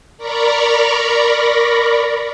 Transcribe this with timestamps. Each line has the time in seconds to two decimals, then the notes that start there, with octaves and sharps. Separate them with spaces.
0.17 A#4 D5 A#5 B5 C#6